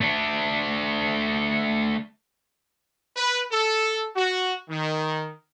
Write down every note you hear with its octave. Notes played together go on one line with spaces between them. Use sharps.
A3 D4
B4
A4
F#4
D#3